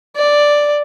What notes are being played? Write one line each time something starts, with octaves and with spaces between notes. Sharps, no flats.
D5